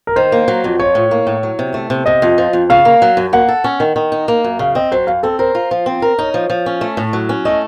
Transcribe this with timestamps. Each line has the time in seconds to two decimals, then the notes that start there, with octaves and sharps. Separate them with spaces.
0.07 A#4
0.16 D#3 C5
0.32 A#3
0.48 F#3
0.64 F2
0.79 F3 C#5
0.95 A2
1.11 A#3
1.27 A2
1.43 F#3
1.59 C3
1.74 A3
1.90 C3
2.06 C3 D#5
2.22 F2
2.38 F3
2.53 F2
2.70 C#3 F5
2.85 A#3
3.02 F#3
3.17 F#2
3.33 A#3 F#5
3.48 A4
3.64 C#4
3.80 D#3
3.96 D#3
4.12 D#4
4.28 A#3
4.44 F#2
4.59 C#3 F5
4.75 C4 D#5
4.92 F#3 C5
5.07 F#2 F5
5.23 C4 A4
5.39 A#4 C5
5.55 F4
5.71 F3
5.86 C4
6.02 A#4
6.18 D#4 C#5
6.34 F3
6.50 F3
6.66 C#4
6.81 A3
6.97 A2
7.13 F#3
7.29 C#4
7.45 A3 D#5